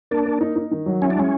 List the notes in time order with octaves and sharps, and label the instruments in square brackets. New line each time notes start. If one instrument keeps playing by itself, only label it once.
[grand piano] A#3 [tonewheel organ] D4
[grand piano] A#3
D#4
D#4
D#3
F#3
[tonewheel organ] C#4 [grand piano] E4
[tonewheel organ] D4
[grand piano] G#3 [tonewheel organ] C#4